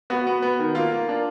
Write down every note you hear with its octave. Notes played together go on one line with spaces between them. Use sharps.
B3 F#4
B3
B3
D#3
A#3 F4
A#3
D4